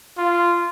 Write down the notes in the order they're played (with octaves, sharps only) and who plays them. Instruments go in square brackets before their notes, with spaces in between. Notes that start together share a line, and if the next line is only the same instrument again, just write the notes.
[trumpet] F4